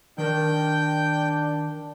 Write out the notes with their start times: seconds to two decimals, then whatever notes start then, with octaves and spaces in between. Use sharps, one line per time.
0.18 D#3 D4 A#4 G5 G6